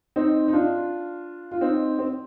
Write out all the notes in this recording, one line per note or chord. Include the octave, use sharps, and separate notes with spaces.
C4 D#4
D#4
D4 F4
F4
C4 D#4
C4